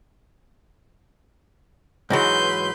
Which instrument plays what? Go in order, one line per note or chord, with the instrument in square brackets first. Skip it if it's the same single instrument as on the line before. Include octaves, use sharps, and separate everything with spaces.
[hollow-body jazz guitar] G#2 E3 F#3 [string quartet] B4 C6 G6